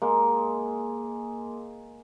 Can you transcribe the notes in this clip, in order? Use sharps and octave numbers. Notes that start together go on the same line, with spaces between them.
G#3 A#3